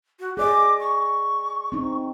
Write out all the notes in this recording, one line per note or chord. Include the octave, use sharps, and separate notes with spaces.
F#4
G#4 D5 D#5 D6
C#6
C4 D#4